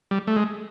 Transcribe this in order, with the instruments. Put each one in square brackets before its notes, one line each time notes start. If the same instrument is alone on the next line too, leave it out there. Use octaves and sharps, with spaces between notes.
[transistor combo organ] G3
A3
G#3